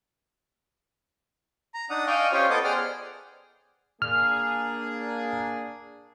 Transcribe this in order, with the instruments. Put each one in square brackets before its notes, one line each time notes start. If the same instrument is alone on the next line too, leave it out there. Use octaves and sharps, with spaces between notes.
[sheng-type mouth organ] A#5
D4 D#4 F#5 D#6
D5 D#5 F5 G5 G#5 C#6
C#4 F4 G4 C5 C#5 G5
B3 A4 D#5 D6 D#6
G#4 C5 D5 F#5 G5 F6
[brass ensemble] A#3 D4 G#4 [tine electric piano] F6